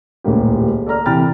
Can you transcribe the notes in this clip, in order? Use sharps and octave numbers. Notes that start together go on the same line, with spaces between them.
D#1 C#2 A2 A#3 G4
A4 D5 A#5 F6
C3 E3 G5 B5 F6 A6